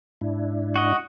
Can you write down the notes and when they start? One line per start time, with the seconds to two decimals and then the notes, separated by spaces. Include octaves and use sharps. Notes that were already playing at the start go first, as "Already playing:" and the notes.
0.21 G#2 D4 E4
0.76 F#4 D#5